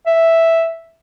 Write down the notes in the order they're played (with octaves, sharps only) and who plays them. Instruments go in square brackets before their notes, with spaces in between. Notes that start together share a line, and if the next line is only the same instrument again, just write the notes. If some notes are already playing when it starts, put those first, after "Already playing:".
[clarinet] E5